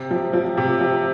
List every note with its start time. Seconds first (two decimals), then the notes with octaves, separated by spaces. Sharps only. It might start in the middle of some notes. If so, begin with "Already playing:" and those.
Already playing: C3
0.11 F3
0.33 F3
0.57 C3
0.80 F3